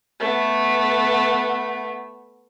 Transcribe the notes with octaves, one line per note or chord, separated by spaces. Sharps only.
A3 B3